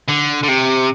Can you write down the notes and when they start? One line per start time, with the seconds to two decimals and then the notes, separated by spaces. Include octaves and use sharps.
0.08 D3
0.43 D3
0.48 C3